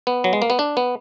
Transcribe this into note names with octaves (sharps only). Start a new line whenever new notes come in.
B3
F#3
G#3
A#3
B3
D4
B3